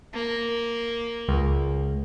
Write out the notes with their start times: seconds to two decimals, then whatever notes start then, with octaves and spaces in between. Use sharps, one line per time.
0.14 A#3
1.28 C#2